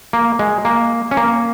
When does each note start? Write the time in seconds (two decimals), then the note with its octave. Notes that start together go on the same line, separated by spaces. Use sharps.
0.13 A#3
0.39 G#3
0.65 A#3
1.11 C#4
1.17 A#3